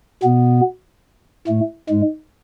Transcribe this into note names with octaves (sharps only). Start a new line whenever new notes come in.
B2 B3
A2 A3
G#2 G#3